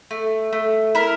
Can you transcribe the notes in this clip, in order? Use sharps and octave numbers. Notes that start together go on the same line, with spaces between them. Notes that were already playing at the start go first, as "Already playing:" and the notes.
A3
A3
E4 A#4